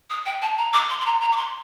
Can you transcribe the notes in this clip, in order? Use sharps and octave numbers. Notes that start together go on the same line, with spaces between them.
D#6
G5
A5
A#5
D6
C6
C6
A#5
A#5
D6
C6